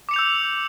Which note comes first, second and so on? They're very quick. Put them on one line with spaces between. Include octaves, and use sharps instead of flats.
D6 C#7 F7 G6 E6